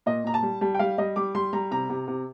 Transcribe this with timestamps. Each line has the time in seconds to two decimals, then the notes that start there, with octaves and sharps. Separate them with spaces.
0.06 A#2 D#5
0.24 A#2 A#5
0.34 A5
0.43 G3
0.61 G3 A5
0.75 G5
0.79 G3 F5
0.98 G3 D#5
1.16 G3 D6
1.35 G3 C6
1.53 G3 A#5
1.71 C3 A#5
1.89 C3
2.08 C3